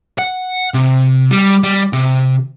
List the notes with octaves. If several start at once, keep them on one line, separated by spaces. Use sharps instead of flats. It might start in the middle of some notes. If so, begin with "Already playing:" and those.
F#5
C3
G3
G3
C3